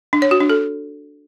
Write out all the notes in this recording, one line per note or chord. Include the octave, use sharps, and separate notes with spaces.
D4
C#5
F#4
D4
A4